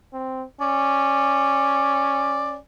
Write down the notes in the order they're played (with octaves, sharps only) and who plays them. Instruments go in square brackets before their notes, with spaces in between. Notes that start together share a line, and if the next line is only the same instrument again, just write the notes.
[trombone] C4
[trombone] C#4 [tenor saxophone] D5